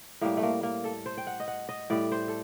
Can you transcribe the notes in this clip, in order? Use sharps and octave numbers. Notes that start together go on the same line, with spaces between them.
A2 G3 A#3
A3
A#3
A#3
A4
C5
G5
F#5
D#5
F#5
D#5
A2 G3 D5
C5
A4